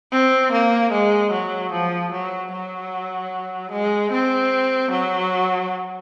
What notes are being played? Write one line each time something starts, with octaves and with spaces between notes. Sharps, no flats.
C4
A#3
G#3
F#3
F3
F#3
F#3
G#3
C4
F#3